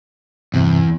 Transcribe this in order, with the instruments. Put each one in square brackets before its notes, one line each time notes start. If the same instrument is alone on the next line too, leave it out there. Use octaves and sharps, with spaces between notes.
[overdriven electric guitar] E2 [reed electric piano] G2 C3